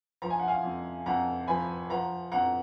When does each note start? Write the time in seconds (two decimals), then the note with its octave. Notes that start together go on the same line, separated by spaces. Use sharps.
0.22 F3 A#5
0.30 G#5
0.40 F#5
0.48 F5 G#5
0.63 F2
1.06 F2 F#5 A#5
1.48 F3 G#5 B5
1.90 F3 F#5 A#5
2.32 F2 F#5 A#5